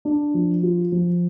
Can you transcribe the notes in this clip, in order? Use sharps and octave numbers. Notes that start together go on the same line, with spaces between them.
D4
F3
F4
F3